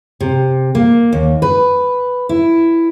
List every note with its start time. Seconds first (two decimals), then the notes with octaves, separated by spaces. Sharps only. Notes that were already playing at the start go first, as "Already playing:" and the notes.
0.20 C3
0.75 A#3
1.13 D#2
1.42 B4
2.29 E4